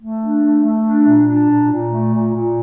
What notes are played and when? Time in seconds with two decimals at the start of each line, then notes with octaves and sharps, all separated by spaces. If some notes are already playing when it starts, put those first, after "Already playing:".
0.02 A3
0.22 D4
0.43 A3
0.64 A3
0.86 D4
1.07 A#2
1.28 D4
1.50 A#2
1.70 A#2
1.91 A3
2.13 A#2
2.34 A#2